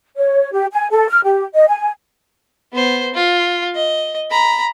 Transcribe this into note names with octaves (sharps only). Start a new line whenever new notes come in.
C#5
G4
G#5
A4
F6
G4
D#5
G#5
B3 C5
F4
D#5
A#5 B5